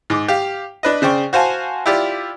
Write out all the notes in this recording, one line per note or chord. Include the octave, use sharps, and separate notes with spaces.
G#2 D6
G4 F5
D4 B4 D#5
C#3 C5 D5 G5 C#6
F#4 C5 F5 G#5 A5
E4 F4 G4 D5